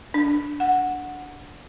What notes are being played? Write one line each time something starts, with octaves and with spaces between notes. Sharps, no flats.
D4
F#5